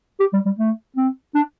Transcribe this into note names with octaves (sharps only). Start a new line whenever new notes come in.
G4
G3
G3
A3
C4
D4